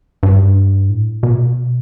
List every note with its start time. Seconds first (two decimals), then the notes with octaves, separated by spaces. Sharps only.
0.23 G2
0.89 A2
1.23 B2